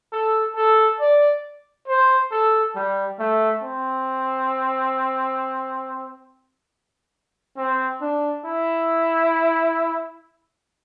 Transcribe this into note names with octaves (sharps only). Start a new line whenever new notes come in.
A4
A4
D5
C5
A4
G3
A3
C4
C4
D4
E4